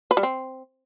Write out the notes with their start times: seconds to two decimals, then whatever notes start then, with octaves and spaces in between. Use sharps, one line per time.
0.11 B4
0.17 G3
0.23 C4